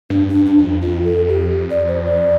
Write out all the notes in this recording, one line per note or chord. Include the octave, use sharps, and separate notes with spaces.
G2 D4
D4
G2
D4
F2
F2 F4
A4
G4
D5
C5
D5